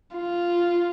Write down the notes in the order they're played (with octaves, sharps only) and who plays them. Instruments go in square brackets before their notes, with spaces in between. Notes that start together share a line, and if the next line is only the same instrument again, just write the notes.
[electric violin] F4